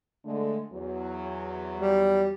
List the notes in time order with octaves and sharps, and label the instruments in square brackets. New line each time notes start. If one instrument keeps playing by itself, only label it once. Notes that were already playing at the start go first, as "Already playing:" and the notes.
[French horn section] D3 G#3 A3
E2 F#3
[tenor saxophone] G3